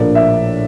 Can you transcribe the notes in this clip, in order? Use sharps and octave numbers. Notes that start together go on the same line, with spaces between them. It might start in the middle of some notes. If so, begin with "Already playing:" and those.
Already playing: A#1 A2 F3 A#3 D4 D5
E5